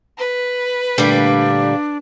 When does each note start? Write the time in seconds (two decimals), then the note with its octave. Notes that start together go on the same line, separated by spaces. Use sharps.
0.18 B4
0.98 A#2 D3 G3 A3 A#3 D4